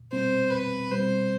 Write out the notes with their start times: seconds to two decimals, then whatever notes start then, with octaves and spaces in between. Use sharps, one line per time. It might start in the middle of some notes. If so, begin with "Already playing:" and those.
Already playing: E2
0.12 B2 G3 C4 C5
0.51 E2 B4
0.90 B2 G3 C4 C5